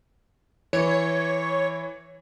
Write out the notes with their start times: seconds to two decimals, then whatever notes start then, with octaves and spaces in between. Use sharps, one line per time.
0.73 E3 C#5